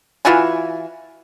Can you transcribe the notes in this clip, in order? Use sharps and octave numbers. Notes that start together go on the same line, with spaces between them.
E3 F4 F#4 G#5